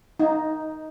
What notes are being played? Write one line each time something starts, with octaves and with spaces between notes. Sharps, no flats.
D#4